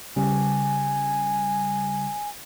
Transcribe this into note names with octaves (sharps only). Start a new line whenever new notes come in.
C#3 G3 G#5